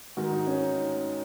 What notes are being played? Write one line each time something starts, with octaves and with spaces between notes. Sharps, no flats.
G#2 D#3 F#4
D#4
C#4
D#4